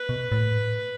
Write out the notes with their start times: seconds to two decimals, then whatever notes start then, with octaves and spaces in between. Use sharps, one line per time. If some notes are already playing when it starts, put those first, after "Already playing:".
Already playing: B4
0.09 B2
0.32 A2